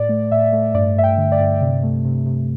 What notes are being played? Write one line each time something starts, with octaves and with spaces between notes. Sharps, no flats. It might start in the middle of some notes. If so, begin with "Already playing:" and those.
Already playing: A2 D5
A3
A2 E5
A3
G2 D5
G2 E5
G5
D3
D5
G2
C3
A3
C3
C3